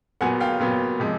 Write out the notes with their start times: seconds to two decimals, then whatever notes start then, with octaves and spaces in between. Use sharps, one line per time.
0.21 A#2 F#3 B3 F#5 G#5
0.40 F5 G5
0.60 A#2 F#3 B3
1.00 C3 F3 G#3